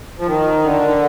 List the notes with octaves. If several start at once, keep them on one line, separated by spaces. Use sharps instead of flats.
F3
D#3
D3